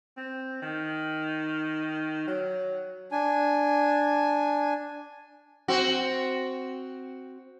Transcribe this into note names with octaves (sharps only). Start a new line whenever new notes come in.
C4
D#3
F#3
D4 G#5
C4 F#4